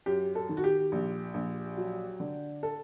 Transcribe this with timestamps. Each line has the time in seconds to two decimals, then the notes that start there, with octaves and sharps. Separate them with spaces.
0.06 F#2 G4
0.35 A4
0.49 D#3
0.57 F#4
0.64 G4
0.92 A#1
1.34 A#1
1.77 F#3
2.20 D3
2.63 A4